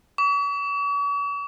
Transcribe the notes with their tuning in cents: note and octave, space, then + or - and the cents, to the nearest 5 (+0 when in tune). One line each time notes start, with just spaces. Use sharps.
C#6 +45